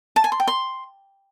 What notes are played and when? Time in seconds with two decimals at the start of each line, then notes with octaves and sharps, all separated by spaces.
0.16 A5
0.24 G#5
0.32 C6
0.40 G5
0.48 C6